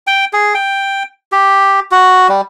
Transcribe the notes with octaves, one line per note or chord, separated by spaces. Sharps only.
G5
G#4
G5
G4
F#4
G3